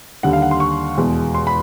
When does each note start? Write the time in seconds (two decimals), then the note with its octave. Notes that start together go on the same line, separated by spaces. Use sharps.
0.23 D#2 D3 G3 F#5
0.33 F5
0.42 F#5
0.51 C6
0.60 C#6
0.98 E2 B2 G#3
1.35 C6
1.47 B5